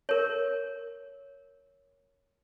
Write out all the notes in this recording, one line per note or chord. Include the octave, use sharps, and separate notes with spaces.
A#4 C#5